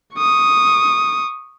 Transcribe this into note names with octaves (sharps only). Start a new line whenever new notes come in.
C#6 D#6